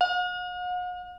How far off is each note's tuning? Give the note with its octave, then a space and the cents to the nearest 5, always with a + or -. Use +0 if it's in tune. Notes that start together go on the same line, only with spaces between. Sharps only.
F#5 -45